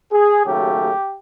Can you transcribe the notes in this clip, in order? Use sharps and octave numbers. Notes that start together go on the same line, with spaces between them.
G#4
D#2 C#3 F#3 A3 G4